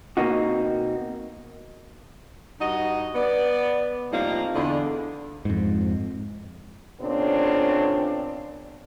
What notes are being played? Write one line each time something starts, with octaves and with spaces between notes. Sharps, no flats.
B2 A#3 C4 D#4 F#4
G2 D#4 F#4 D#5
B3 D5
A2 F3 G3 A#3 C4 D#4
E2 D3 D4
F2 G#2
A#2 C#3 B3 C4 D4 C#5